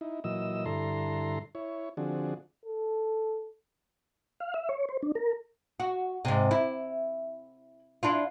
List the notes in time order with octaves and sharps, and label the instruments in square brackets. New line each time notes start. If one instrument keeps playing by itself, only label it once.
[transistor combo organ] D#4 E4
A#2 E3 F#3 D#5 E6
G2 D3 E4 A4 A#5 C6
E4 C#5
D3 F3 C4 D4 F#4 G#4
[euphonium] A4
[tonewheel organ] F5
E5
C#5
C5
D4
A#4
[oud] F#4
G#2 C3
E4
D4 E4 F4